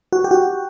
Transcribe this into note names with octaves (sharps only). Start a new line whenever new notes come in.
F#4
G4
F#4